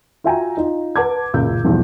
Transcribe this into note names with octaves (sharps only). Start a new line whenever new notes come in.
F4 F#4 E5 G5 G#5 A#5
D#4 F4
B4 F#5 A5 D6 G#6
D#1 C#2 F#2 A#2 E6 G6
B1 E2 G#2 E3 F3 G3